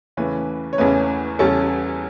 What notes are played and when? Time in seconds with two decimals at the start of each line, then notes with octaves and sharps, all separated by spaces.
0.17 E2 C#3 E3 A3 C#4 B4
0.73 C#5
0.78 E2 C#3 E3 A3 C#4 B4
1.39 E2 C#3 G3 C#4 A4